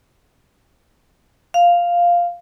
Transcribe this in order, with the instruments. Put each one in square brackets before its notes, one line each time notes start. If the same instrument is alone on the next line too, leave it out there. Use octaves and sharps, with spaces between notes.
[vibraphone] F5